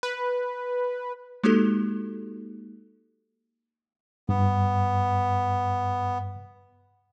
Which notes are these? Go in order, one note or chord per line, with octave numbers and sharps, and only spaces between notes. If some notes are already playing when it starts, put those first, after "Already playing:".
B4
G#3 A#3 D#4 F#4 G4 A4
G2 B3